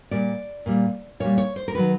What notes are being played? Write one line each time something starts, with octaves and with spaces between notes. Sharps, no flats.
A#2 G3 D5
A#2 G3
A#2 G3 C#5
C#5
C5
A#4
D#3 F#3 B4